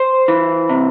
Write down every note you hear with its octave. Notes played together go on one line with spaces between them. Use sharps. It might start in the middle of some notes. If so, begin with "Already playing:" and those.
Already playing: C5
E3
C3